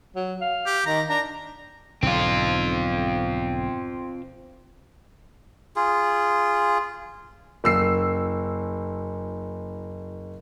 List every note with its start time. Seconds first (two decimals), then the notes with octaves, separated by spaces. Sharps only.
0.16 F#3
0.41 F5
0.66 G4
0.86 D#3 A#5
1.09 D4 A#5
2.03 B1 G#2 D3 C4 F4
5.76 F4 G#4
7.64 F#1 E6 C7